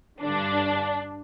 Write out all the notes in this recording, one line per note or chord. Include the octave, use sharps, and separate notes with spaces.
G2 D3 D4